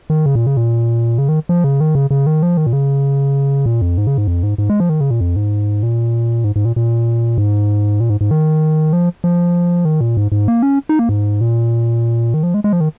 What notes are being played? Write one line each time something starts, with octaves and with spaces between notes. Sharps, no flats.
D#3
C#3
A#2
C#3
A#2
C#3
D#3
F3
C#3
D#3
C#3
C#3
D#3
F3
D#3
A#2
C#3
A#2
F2
G#2
C#3
G#2
F2
G#2
G#2
G#3
F3
D#3
C#3
A#2
F2
G#2
A#2
G#2
G#2
A#2
A#2
G#2
A#2
G#2
G#2
D#3
F3
F3
D#3
A#2
G#2
G#2
A#3
C#4
D#4
A#3
G#2
A#2
D#3
F3
G#3
G#3
F3
D#3